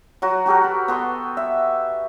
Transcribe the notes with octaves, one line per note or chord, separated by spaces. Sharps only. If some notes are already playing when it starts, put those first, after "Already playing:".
F#3 F#4
F#4 G4 A4 A#4
B4
B3 A4 C6
E5